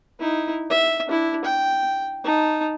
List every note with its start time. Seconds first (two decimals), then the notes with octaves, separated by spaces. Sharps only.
0.20 D#4 E4
0.70 E5
1.07 D4 E4
1.45 G5
2.24 D#4 A5